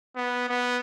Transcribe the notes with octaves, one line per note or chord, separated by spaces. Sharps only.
B3
B3